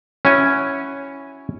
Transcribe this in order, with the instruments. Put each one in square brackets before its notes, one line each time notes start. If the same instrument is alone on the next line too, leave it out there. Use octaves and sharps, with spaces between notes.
[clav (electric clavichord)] C#4 E4 F#4 G#5